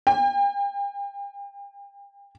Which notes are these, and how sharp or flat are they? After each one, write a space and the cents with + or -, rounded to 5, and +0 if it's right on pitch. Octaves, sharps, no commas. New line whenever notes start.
G5 +40